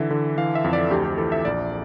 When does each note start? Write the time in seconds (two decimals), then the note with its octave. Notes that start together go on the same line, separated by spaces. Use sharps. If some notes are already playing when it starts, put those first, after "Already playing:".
Already playing: D3 E3 E5
0.11 D3
0.37 E3 F5
0.55 E5
0.64 F2
0.73 D5
0.91 D2 G4
1.04 G4
1.18 E3 A4
1.32 E5
1.45 A#1 D5